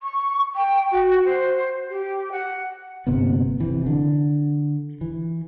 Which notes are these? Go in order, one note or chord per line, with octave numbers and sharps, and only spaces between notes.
C#6
G5
F#4
C5
G4
F#5
G1 C3 A#3 B3
C3 E3
D3
E3